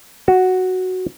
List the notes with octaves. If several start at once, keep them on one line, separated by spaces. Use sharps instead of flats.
F#4